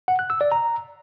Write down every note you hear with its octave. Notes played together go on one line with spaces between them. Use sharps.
F#5
F#6
E6
D5
A#5